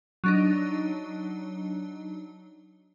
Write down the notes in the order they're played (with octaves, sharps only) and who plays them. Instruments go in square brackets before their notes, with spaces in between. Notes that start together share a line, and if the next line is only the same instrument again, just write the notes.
[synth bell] F#3 D4 D#4